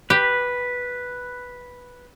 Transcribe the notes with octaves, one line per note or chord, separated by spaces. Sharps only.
G4 B4